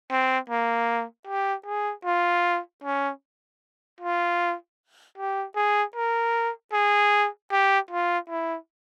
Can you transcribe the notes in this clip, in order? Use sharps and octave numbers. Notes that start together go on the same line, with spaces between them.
C4
A#3
G4
G#4
F4
C#4
F4
G4
G#4
A#4
G#4
G4
F4
E4